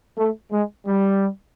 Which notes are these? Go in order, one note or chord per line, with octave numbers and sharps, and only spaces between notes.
A3
G#3
G3